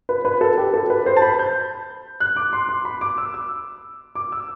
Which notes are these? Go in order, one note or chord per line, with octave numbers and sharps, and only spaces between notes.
B4
B4
A4
G4
A4
B4
C5
A5
B5
G6
F#6
D6
C6
C6
B5
D6
E6
E6
D6
E6